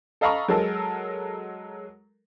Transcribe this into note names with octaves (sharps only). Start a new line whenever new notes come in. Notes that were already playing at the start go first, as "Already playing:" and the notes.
A4 D#5 F5 A#5 B5 C#6
F#3 G#3 A4 A#4